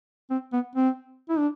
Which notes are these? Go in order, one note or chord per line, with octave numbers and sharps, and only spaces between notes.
C4
B3
C4
E4
D4